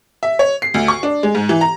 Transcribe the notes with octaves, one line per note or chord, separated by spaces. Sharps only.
E5
C#5
C7
D2
C#6
D4
G#3
G#2
E3
A#5